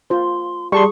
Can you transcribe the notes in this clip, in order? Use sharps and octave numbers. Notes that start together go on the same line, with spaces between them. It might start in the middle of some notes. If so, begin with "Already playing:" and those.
F4 C5 C6
G3 G#4 A5 C6 C#6